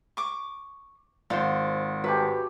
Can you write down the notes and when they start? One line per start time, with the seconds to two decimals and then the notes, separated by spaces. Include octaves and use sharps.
0.17 C#6 D6
1.30 G#1 F4 C5 F#5
2.04 F#3 A3 G4 B4